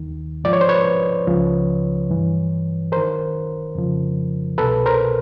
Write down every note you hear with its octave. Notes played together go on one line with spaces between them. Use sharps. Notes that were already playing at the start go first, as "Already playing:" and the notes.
Already playing: D#2 D#3
G#2 F3 D5
C#5
C5
B4 C#5
C#2 C#3 F3
G2 E3
F#2 D#3 A#4 C5
F2 C#3 F3
C2 B2 A4 B4
A#4 C5